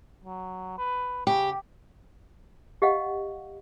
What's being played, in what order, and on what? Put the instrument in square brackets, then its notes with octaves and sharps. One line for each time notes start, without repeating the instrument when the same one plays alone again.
[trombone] F#3
B4
[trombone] C#3 [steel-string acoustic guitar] G4
[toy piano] G4 D#5 F5 F#5